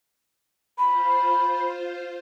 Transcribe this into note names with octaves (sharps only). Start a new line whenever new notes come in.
F4 C5 B5